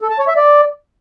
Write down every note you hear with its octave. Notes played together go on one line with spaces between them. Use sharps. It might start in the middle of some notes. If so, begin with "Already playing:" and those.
A4
A5
C#5
E5
D5